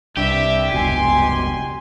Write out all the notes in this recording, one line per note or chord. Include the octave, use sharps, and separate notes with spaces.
C2 G2 G4 E5
F1 C#2 G2 B2 G#5 C6